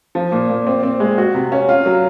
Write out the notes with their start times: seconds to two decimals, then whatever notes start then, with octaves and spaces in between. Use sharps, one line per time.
0.15 F3
0.32 A#2
0.49 A#2
0.67 C4
0.83 C4
1.00 G#3
1.18 F#4
1.35 C3
1.52 C#4
1.69 F4
1.86 F#3